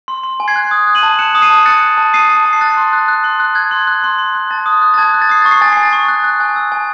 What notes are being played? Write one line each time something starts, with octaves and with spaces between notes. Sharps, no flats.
C6
C6
G#5
G#6 C7
F#6
D#6
F#6
D#7 F#7
A5
F#6 C#7 E7
D#6
C7 D#7
A5
F#6 A6 C#7
F#6
A5
D#6 C7 D#7
A5
A5
C7
F#6 A6
C6
F#6
F#6
C6
F#6
F#6 G#6
C6
F#6
C6
C6
F#6
A5 A6
D#6
F#6
A6
A5 G#6
F#6
A6
D#6 C7
C#6 A6
C7
G#5 A6
G#5 C7
A6
C#6
F#6
F#6
G#5
E6
G#5